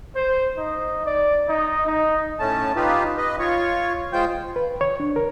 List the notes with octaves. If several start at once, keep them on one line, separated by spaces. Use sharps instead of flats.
C5
D#4
D5
D#4
D#4
A2 A3 C#4 A5
D#4 F4 G4 B4
B4 D#5
F4 C#5 C#6
G#3 F4 C5 G5 G6
B4
C#5
D4
A#4